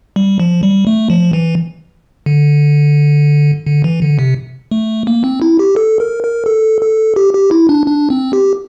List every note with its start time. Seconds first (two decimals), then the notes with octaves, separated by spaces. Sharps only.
0.16 G3
0.40 F3
0.63 G3
0.87 A3
1.10 F3
1.33 E3
2.26 D3
3.66 D3
3.84 E3
4.02 D3
4.19 C3
4.71 A3
5.07 A#3
5.24 C4
5.42 E4
5.59 G4
5.76 A4
6.00 A#4
6.23 A#4
6.46 A4
6.82 A4
7.16 G4
7.34 G4
7.51 E4
7.69 D4
7.87 D4
8.10 C4
8.33 G4